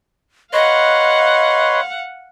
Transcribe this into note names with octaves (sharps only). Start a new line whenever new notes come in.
B4 C#5 D#5 F5 F#5 C6